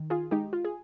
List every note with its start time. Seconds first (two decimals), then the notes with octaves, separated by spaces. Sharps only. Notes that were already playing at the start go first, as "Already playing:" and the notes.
Already playing: D#3
0.10 F4 G#4
0.31 G#3 D#4 G4
0.53 F4
0.65 G#4